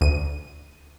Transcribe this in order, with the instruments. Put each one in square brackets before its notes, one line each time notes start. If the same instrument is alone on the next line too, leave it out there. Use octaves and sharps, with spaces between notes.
[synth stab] D2 D#7